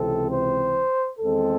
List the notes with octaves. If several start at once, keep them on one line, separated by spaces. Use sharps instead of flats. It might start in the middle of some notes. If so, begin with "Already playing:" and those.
Already playing: C#2 C3 E3 C4 A4
C5
E2 D#3 G#3 C4 A4